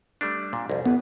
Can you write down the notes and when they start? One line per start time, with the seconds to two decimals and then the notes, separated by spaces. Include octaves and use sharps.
0.21 G3 A3 D4
0.53 A#2
0.70 C2 F2
0.85 A1 B3